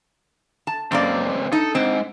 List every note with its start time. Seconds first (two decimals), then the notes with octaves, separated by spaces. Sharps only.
0.67 A5
0.92 C#2 F#2 A#3 C4 D5
1.52 D#4 A4
1.75 G#2 C4